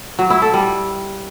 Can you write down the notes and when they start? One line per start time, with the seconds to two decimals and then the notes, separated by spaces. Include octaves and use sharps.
0.19 F#3
0.30 E4
0.42 A4
0.54 G3